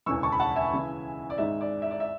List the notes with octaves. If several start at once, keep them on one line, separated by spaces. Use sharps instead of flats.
E1 D2 C#3 E3 C#6 E6
A5 C#6
B5
F#5 A5
E5 G#5
E2 C#3 E3
D5
G#1 G#2 G#3 E5
D5
E5
D5
E5